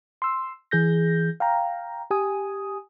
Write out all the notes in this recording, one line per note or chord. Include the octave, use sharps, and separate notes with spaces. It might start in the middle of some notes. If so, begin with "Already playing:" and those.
C6 E6
E3 G#4 G6 A#6
F5 G5 A#5
G4 G#5 D#6